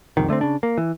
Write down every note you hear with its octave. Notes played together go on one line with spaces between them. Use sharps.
F#1 C2 F2 D#3
D3 A3 B3 C4
C#3 D4
A#3
E3